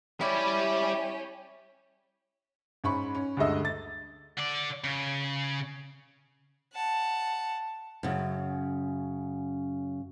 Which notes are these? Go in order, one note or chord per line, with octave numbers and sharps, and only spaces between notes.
G3 C#4 E4 G4 D5
G#2 C#4 B5 C#6
C#4
D2 G2 G#3 D#5 E6
A6
D3 D5
C#3
F#5 A5
F#2 C#3